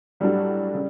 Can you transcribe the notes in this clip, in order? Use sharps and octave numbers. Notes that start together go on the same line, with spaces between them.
A2 F#3 G3 A3 D4 F#4
C#3